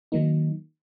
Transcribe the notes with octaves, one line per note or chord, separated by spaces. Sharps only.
D#3 F#3 A#3 D#4